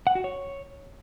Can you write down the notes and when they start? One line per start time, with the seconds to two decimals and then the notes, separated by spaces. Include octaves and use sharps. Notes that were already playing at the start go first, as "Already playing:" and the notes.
0.07 F#5
0.15 F#4
0.24 C#5